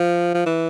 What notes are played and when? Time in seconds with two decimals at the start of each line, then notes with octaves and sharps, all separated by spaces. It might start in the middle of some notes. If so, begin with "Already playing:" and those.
Already playing: F3
0.34 F3
0.46 E3